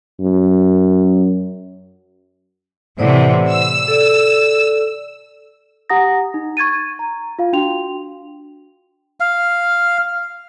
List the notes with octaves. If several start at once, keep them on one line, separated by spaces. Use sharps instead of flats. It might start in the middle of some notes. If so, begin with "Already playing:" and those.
F#2
A2 C3 E3 C5 D5 F#5
E6
A4 D5
G4 F#5 A#5 D#6 A#6
D#4
C#6 G#6 A6 D#7
A#5
F4 F5
D4 F#4 G5 C6 F7
F5